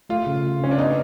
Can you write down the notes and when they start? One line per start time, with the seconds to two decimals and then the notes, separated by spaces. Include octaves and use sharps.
0.10 A3 F4
0.27 C#3
0.44 C#3
0.60 C#3 C#4
0.71 D4
0.78 B3 D#4